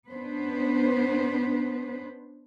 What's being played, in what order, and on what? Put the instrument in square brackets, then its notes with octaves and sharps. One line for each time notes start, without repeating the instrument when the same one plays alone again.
[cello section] B3 C#4 D4 B4 C5